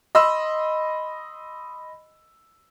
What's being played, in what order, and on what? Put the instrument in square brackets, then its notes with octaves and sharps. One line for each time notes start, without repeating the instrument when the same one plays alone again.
[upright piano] D#5 B5 C6 E6